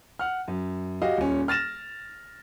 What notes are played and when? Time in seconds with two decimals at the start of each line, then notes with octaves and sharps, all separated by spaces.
0.19 F#5 F6
0.48 F#2
1.02 F#4 G4 D#5 F5
1.18 D#1 C#4
1.48 F6 A6 A#6 E7